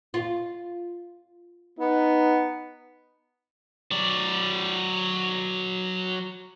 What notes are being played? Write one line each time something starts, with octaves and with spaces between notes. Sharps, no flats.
F4
B3 D#4
F#3 D5